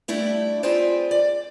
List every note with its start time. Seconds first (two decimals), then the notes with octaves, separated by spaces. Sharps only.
0.08 G3 A3 D4 E4 G4
0.63 C4 F4 G#4 B4 C5 D5
1.11 D5